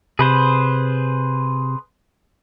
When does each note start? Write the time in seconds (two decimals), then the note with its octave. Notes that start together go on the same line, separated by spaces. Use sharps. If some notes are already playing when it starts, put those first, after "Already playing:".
0.19 C3 G#4 B4 C5